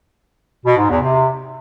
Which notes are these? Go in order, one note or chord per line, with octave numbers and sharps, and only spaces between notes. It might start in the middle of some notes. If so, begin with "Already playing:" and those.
B2
G#2
E2
C3